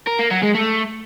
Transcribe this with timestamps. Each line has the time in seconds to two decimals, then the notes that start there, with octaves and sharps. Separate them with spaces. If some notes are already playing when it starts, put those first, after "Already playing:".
0.07 A#4
0.19 A#3
0.31 F#3
0.43 G#3
0.55 A3